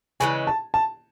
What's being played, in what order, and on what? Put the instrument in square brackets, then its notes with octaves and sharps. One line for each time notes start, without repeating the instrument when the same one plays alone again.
[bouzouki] C#3 E3 G#3 [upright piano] G#5
[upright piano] A5
A5